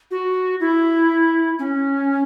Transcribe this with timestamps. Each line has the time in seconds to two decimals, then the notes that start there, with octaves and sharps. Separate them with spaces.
0.11 F#4
0.60 E4
1.59 C#4